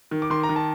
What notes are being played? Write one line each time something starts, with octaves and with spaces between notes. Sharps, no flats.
D#3
D6
D#3 C6
A#5
D#3
A5